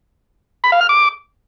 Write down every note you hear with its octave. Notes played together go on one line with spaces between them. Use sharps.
B5
F5
F6
D6